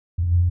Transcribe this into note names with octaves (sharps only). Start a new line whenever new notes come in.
F2